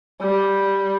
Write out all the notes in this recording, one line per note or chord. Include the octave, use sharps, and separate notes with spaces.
G3